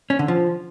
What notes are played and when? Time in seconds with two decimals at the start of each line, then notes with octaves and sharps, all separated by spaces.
0.10 C#4
0.19 D3
0.28 F3